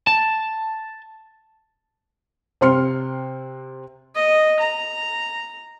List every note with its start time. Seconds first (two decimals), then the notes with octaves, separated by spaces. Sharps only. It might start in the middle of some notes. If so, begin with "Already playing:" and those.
0.07 A5
2.61 C3 C4 C6 F6 C#7
4.15 D#5
4.60 A#5